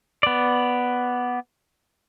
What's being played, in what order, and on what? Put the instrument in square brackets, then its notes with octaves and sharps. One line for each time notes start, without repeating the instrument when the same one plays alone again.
[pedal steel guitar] B3 D5